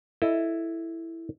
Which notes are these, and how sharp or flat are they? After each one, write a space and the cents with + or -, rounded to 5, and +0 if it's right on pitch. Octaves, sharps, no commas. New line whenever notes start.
E4 +0 A4 +0 D#5 +5